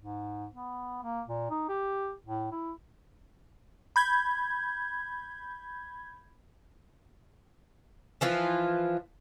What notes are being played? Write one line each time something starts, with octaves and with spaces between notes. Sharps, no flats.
G#2
B3
A#3
A#2
D#4
G4
A2
E4
B5 G6 G#6
E3 F3 F4